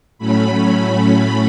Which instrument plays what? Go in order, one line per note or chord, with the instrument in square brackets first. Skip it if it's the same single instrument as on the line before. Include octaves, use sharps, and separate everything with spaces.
[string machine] A2 F#3 A3 C#4 B5